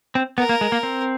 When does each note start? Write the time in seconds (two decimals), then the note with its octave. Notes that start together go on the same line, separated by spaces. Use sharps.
0.15 C4
0.38 B3 A#4
0.49 A#3
0.61 G#3
0.72 A#3
0.83 C4